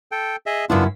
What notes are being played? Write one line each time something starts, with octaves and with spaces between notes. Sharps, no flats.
A4 G5
G#4 D#5 E5
F#2 C#3 B3 D4 E4 F4